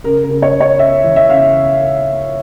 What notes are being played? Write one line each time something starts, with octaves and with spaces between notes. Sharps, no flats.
C#3 A#4
A#4
C#3
A#4
C#5
C#3
C#5
C#3 E5
E3
E5
C#3 F5